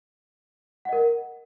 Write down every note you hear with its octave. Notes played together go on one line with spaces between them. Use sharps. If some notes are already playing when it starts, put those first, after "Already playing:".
A#4 D#5 F#5